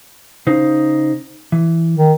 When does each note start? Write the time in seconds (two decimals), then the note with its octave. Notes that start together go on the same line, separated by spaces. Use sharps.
0.47 C#3 D#4 C5
1.52 E3
1.97 D#3